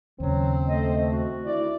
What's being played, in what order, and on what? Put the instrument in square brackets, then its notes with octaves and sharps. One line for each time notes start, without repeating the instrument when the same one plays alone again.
[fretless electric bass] D#2 C#3 [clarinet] F#3 [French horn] C4
[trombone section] A3 [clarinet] D#5
[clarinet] F#4
[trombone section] D2 D#3 E4 [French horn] D5